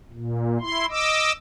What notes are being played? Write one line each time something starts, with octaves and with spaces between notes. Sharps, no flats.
A#2
E4 C6
D#5 D6 E6